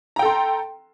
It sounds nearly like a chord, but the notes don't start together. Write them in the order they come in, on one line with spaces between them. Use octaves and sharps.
A#5 G5 A4 C6